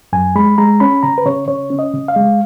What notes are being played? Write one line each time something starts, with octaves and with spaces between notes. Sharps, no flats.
F#2 G#5
G#3 B5
G#3 A#5
C#4 B5
C#3 A#5
B4
C#3 C#5
C#3 C#5
C#4
D#5
C#3
F5
G#3